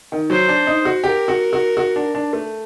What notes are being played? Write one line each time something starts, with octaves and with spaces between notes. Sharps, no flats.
D#3
F#3 C5
D4
D#4
F#4
G4 A#4
F#4
F#4
F#4
D4
D4
A3